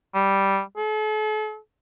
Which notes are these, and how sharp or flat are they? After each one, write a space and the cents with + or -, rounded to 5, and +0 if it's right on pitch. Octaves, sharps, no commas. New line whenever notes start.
G3 -5
A4 -40